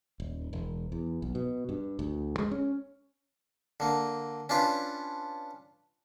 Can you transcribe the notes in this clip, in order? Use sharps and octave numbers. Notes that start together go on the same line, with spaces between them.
D#1
E1
E2
B1
B2
G2
D2
G#3
C#4
D3 A#3
C#4 D4 F4 B4